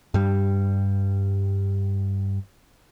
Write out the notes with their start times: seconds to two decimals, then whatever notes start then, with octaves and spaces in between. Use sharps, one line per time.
0.14 G2 G3